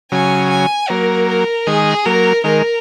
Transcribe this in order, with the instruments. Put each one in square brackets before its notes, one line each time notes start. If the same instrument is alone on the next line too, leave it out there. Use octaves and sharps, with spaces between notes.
[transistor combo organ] C#3 F#3 [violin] G#5
[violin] G#5
[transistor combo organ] F#3 A#3 [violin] A#4
[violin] A#4
[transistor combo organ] D#3 G#3 [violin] G#4
[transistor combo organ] F#3 A#3 [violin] A#4
[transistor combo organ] D#3 G#3 [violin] A#4